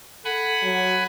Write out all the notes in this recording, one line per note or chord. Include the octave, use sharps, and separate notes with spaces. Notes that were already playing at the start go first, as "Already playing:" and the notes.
A4 F#5 G#5 B5
F#3